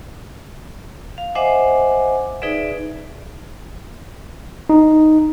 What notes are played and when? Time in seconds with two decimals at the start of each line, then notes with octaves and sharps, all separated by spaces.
1.18 F5
1.35 C5 D#5 E5 F#5 G#5 D6
2.42 D#4 G#4 B4 D5 E5
4.69 D#4